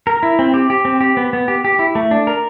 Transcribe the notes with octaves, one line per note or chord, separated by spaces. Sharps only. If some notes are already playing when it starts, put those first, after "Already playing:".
A#4
E4
C4
G4
G4
C4
G4
B3
B3
G4
G4
E4
A3
D4
A#4